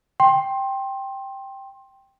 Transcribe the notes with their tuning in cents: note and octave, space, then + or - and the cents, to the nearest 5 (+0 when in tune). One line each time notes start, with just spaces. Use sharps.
G5 +0 C6 +25